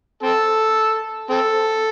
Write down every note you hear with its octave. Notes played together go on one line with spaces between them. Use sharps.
C4 A4
C4 A4